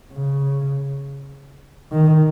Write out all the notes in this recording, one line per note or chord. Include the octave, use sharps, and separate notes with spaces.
C#3
D#3